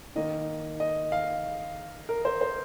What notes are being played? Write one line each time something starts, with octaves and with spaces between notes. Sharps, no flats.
D#3 A#3 D#5
D#5
F5
A#4
C5
C5